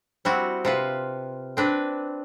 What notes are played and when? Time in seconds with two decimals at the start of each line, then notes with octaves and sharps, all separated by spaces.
0.25 G3 C4 E4 F#4
0.65 C3 F4 B4
1.57 C4 D4 B4